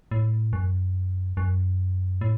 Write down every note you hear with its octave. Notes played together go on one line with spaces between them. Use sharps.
A2
F#2
F#2
A2